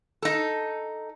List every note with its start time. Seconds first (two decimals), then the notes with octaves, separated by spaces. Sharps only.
0.22 D#4 A4